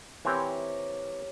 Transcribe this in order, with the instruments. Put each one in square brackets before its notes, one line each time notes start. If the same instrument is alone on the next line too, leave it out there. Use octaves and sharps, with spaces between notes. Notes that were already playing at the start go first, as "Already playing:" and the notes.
[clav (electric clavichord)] E3 C4 [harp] G4 A#4 C#5